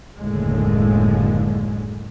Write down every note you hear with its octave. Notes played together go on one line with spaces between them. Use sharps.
F#1 D#2 A2 D3 G#3